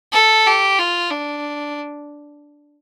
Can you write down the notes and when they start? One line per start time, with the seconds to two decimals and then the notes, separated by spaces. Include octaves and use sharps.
0.13 A4
0.46 G4
0.79 F4
1.11 D4